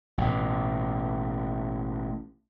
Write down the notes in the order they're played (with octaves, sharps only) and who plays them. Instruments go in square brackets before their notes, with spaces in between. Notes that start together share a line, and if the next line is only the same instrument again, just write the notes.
[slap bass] A1 B2